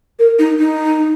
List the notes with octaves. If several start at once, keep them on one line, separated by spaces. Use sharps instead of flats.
A#4
D#4
D#4